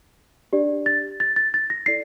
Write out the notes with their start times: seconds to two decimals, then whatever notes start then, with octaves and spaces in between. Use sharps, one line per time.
0.53 D4 G4 D5
0.86 A6
1.20 A6
1.36 A6
1.54 A6
1.70 A#6
1.86 E4 A4 D5 C7